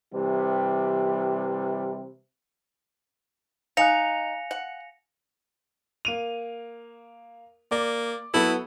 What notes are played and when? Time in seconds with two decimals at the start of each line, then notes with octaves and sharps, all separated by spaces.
0.14 C3 E3 G3
3.77 D#4 F5 G#5 F#6 A#6 C#7 F7
4.51 F#5
6.05 A#3 D#7 F7
7.71 A#3 D5
8.34 F#3 B3 E4 A4